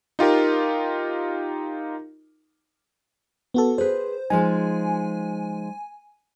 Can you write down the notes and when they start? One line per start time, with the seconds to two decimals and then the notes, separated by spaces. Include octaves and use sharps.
0.19 D#4 F4 G4 A#4
3.54 B3 F#4 A4
3.78 G#4 B4 C5
4.30 F3 G#3 D#4 G#5